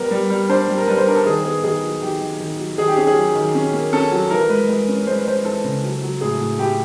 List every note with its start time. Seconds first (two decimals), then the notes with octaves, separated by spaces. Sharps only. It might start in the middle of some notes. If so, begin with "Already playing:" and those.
Already playing: G3 B3 A#4
0.11 G3
0.30 G3
0.49 D4 C5
0.68 G3
0.78 A#4
0.87 G3 B4
0.97 C5
1.06 D4 A#4
1.16 A4
1.25 D#3 G#4
1.44 B3 G#4
1.64 D#3 G#4
1.83 F#3
2.02 D#3 G4
2.21 D#3
2.40 D#3
2.59 F#3
2.77 D#3 G#4
2.88 G4
2.97 C#4 G#4
3.07 G#4
3.16 F#3
3.35 D#3
3.55 C#4
3.73 A#3
3.93 C#4 A4
4.11 F#3
4.30 E3 A#4
4.49 G#3 B4
4.69 G#3
4.88 C#4
5.06 G#3 C5
5.16 B4
5.26 G#3 C5
5.45 E3 A4
5.64 C#3
5.83 F#3
6.02 F#3
6.21 A2 G#4
6.41 A2
6.59 A2 G4